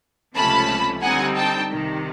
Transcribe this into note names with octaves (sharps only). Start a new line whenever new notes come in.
C#2 C3 F3 A3 C#4 A5 B5
D3 G3 C4 D#4 F#5 G#5
G5 A5
C2 C3 D#3